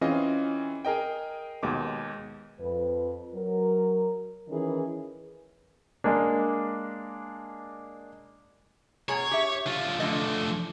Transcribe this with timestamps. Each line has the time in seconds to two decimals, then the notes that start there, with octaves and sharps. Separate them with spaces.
0.01 E3 C4 C#4 F4 G#4 D#5
0.85 G#4 A#4 D#5 G5
1.63 D#2 B2 G#3 D6
2.60 F2 B4
3.34 F#3 A#4
4.49 D#3 E3 C#4 G#4 A#4 B4
6.04 G#3 A#3 D4
9.09 B2 G#4 C#5 A#5
9.31 G4 E5
9.66 D3 F4
10.00 D3 F3 A3 D#5